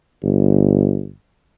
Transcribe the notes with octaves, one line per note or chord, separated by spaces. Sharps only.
G1